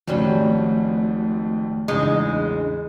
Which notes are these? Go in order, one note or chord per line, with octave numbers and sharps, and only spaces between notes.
G#1 F2 F#3 G3 A3 C#4
A1 E2 C#3 G#3 D4 D#4 G#5